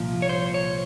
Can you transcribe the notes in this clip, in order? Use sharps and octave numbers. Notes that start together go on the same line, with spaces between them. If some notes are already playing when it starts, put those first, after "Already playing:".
Already playing: C2 A#2 F3
C#5
C5
C#5